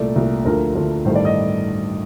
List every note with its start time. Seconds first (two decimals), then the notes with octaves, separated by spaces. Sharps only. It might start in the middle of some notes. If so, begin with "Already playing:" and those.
Already playing: C2 A#2 A3 D5
0.16 C2 A#2 A3
0.45 D2 D3 F3 A3 A#4
0.75 D2 D3 F3 A3
1.05 A1 G2 D#3 A3 C5
1.15 D5
1.25 D#5